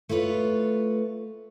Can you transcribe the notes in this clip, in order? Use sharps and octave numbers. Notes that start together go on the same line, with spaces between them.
A3 F4 B4 C#5